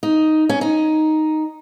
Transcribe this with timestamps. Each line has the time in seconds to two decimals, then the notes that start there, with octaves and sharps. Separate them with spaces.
0.03 D#4
0.49 C#4
0.61 D#4